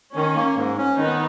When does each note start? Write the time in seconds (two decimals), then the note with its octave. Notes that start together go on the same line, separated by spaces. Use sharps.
0.16 D#3 C#4
0.36 A#3
0.57 G#2
0.78 C#4
0.98 D#3 B3 D#4